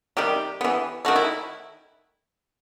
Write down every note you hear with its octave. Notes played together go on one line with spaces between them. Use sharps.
C3 D#3 G3 G4
E3 B3
D#3 A3 F#4
E4